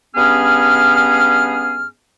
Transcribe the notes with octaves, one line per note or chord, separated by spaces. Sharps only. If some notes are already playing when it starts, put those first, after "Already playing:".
G2 B3 C#4 G#4 F6